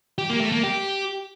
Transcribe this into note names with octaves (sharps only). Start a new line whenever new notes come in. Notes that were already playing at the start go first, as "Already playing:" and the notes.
G4
A#3
A3
A#3
G4